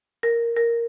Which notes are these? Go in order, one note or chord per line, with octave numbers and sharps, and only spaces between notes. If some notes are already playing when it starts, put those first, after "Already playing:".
A#4
A#4